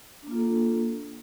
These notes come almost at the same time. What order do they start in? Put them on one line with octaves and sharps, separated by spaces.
D4 A#3 F4 A4